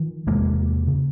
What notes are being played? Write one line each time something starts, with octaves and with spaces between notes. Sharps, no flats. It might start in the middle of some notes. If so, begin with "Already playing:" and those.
Already playing: D#3 F3
E2 C3 G#3 A#3
C#3